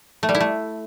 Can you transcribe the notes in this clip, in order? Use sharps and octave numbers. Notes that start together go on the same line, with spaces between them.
A3
G3
E4
A3